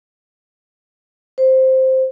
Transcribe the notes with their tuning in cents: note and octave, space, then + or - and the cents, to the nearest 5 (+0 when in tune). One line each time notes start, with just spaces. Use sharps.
C5 +0